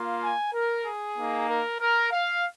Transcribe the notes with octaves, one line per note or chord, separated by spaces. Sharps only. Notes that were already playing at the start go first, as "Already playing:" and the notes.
Already playing: A#3 F4
G#5
A#4
G#4
A#3 D#4
A#4
A#4
F5